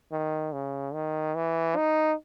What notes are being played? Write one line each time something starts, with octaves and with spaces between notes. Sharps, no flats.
D#3
C#3
D#3
E3
D#4